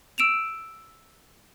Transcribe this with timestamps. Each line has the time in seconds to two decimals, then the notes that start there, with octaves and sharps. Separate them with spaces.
0.18 E6 D7 E7 F7